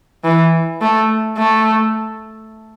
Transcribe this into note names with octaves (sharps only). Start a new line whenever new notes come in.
E3
A3
A3